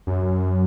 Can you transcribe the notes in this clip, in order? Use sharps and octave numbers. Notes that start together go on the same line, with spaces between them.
F#2